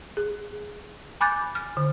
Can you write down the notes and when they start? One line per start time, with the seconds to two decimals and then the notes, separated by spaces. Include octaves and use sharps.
0.17 G#4
1.21 G#5 B5 D6 F#6 G6 A6
1.55 F6
1.77 D3